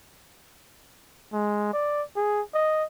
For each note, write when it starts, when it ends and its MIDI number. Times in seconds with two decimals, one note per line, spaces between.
1.33 1.73 56
1.73 2.02 74
2.16 2.41 68
2.54 2.84 75